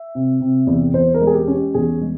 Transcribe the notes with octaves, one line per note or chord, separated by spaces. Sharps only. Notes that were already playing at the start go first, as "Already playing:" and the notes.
Already playing: E5
C3
C3
E2
E2 C5
A#4
G#3
G#4
G4
C#4
G4
E2 G#4
G#3